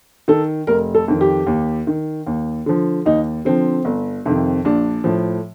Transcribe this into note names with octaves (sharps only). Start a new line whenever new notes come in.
D#3 A4
F1 A#4
A4
F2 D#3
G4
D#2
D#3
D#2
D3 F3
D#2 D#4
D3 F3 C4
G1
F2 C3 D#3
A#1 D4
A2 F3